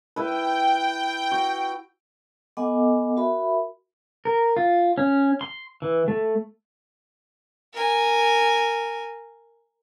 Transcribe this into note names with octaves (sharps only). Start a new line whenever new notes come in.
E4 B4 G5
F#4
B3 A4 D#5 F#5 G#5 D6
F#4 A#4 E5 B5
A#4
F4
C#4
C6
E3
A3
A#4 G#5